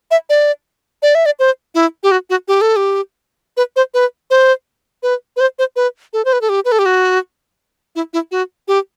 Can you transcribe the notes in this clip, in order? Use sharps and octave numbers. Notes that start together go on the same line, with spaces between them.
E5
D5
D5
E5
D5
C5
E4
G4
F#4
F#4
G4
A4
G4
B4
C5
B4
C5
B4
B4
C5
C5
B4
A4
C5
B4
A4
G4
B4
A4
G4
F#4
E4
E4
F#4
G4